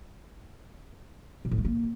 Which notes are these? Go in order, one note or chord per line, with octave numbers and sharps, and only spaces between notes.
A#2
A2
G3
A#3